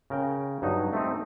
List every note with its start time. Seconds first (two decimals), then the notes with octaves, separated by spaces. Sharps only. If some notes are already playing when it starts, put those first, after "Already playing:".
0.10 C#3 A#4 G5
0.62 G2 F#3 D#4
0.93 A3 C4 D#4